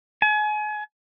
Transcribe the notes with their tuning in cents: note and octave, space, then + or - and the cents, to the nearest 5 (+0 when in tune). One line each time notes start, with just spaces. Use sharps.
G#5 +35